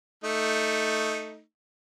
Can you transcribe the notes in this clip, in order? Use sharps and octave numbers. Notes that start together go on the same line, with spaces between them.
A3 D#4